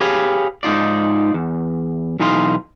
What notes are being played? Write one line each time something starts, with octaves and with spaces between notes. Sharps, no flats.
G4 G#4 B4 C#5 F5
G#2 D#4 F4 D5
E2
B1 E3 D#4 D#5 F5 C6